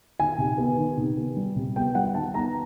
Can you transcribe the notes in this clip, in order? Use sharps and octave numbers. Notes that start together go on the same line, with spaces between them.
D#3 G#5
C3
B3
D#3
C3
B3
G3
C3
B3 G5
G3 F#5
D#3 A5
B3 A#5